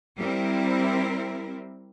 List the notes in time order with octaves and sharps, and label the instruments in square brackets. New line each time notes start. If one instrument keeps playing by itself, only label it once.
[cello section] G3 C4 E4 A#4